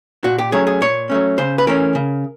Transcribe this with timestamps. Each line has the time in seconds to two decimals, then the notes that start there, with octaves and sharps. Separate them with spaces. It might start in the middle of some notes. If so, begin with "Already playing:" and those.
0.24 A#2 F#4
0.38 G4
0.52 F#3 A3 C#4 G#4
0.67 G#4
0.81 A#2 C#5
1.10 F#3 A3 C#4
1.38 C#3 C5
1.58 B4
1.67 E3 A3 C#4 A#4
1.95 C#3